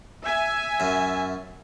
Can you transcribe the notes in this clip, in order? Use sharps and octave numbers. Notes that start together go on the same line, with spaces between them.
E5 G#5
F#2